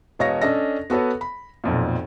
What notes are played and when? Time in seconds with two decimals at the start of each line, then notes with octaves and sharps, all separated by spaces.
0.19 E1 B2 C#5 D#5 F5 A#6
0.42 C#4 D4 A4 D#5 A#6
0.90 B3 F#4 A4 B4 C#5
1.21 B5
1.64 B1 F2 A#2